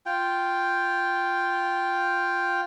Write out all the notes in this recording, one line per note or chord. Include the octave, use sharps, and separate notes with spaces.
F4 G5